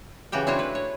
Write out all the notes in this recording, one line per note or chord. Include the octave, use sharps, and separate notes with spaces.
C#3 E3 F#4 G4 G5
A3 D4 E4 F#4 C5 C#5
B4
C#5